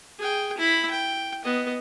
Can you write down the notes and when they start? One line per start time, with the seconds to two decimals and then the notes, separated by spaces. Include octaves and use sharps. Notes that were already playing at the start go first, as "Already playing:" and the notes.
0.19 G#4 G5
0.58 E4 B5
0.91 G5
1.44 B3 D#5